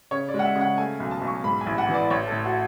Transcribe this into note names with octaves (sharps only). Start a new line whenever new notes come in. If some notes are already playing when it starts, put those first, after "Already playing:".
C#3 C#5
D5
G#3
F#5
E5
C#3
F#5
A3 G#5
B1
A5
B1
C#6
G#2 B5
G#5
A1
F#5
E3
D5
A1 C#5
A2 A4
F#4